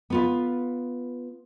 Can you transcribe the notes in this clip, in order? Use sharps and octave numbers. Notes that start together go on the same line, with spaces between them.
B3 F4 B4